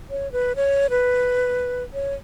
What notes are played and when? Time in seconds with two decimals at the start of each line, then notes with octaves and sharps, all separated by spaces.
0.10 C#5
0.32 B4
0.56 C#5
0.90 B4
1.94 C#5